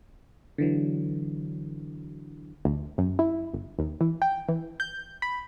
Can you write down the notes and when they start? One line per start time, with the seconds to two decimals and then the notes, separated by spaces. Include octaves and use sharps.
0.58 D3 E3 F#3
2.65 D2
2.98 F#2
3.19 E4
3.54 G1
3.79 D#2
4.01 E3
4.22 G5
4.49 E3
4.80 G6
5.22 B5